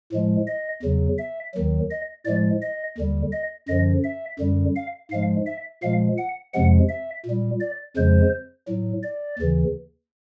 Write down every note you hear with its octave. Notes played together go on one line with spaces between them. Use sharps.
A2 F3 G#3
D#5
E2 C#3 F#3
E5
D#2 D#3 F#3
D#5
A2 F3 G#3 D5
D#5
D#2 D3 G3
D#5
F#2 D3 F3 D#5
E5
F#2 D3 G3
F5
G#2 F3 G#3 F5
E5
A#2 F3 G#3 F5
F#5
F2 C3 F3 G#3 F#5
E5
A#2 G3
D5
F2 C#3 F3 G#3 C5
A2 F#3
D5
D#2 C#3 E3